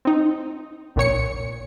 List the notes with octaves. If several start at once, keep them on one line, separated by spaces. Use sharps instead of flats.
C4 D#4
A#1 A#2 C#5 C#7